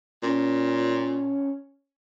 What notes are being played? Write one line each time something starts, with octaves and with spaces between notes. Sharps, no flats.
A#2 C#4